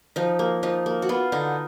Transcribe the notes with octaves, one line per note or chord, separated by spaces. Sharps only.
F3 D#4
A#3
F3 D#4
A#3
F#4
B3 F4
D3 D#4